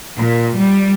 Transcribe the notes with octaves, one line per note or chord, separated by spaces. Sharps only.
A#2
G3